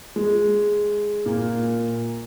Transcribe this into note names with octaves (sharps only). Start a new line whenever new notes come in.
G#3
A#2 A#3